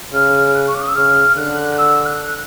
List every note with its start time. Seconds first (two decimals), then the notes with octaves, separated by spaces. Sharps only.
0.13 C#3 F6
0.54 F#6
0.67 C#6
0.75 D6
0.81 D#6
0.88 E6
0.95 C#3 F6
1.37 D3 F#6
1.78 E6
2.06 F#6